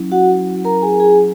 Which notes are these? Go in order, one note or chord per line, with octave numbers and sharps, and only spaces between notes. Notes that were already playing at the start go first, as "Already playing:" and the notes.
Already playing: F#3 C#4 E4
F#4 F#5
A#4 A#5
G#4 G#5
G#4 G#5